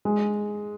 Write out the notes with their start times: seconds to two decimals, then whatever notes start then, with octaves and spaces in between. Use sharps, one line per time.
0.05 G#3